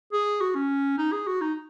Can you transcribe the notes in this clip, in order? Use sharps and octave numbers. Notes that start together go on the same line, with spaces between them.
G#4
F#4
C#4
D#4
G#4
F#4
D#4